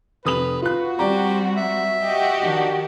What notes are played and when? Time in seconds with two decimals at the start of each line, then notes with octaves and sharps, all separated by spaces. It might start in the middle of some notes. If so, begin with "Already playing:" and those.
0.25 F1 B4 D#6 F#7
0.62 F4 F#4 B4 F#6
0.99 G3 C4 G4 D5 A#5
1.56 E5
2.03 F#4 G4 D#5
2.43 D#3 D4